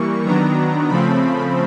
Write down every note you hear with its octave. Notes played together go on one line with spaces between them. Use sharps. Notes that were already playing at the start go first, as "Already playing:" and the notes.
Already playing: E3 G3 A#3 C#6
D#3 F#3 B3 D4 A#5
C#3 F3 A3 C4 B5